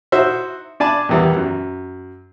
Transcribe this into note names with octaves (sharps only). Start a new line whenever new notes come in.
D#4 E4 F#4 C5 E5
D4 D5 G#5 A5 B5
E2 D#3 E3 G3 B3
F#2